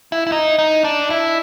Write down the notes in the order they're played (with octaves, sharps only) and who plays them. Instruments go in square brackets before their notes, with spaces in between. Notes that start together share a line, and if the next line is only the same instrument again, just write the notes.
[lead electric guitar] E4
E4
D#4
D#4
D4
E4